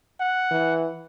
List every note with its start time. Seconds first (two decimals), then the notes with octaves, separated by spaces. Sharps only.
0.20 F#5
0.51 E3